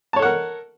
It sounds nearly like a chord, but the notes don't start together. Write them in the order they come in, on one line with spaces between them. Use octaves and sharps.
A5 C#5 A4 F#5 A#4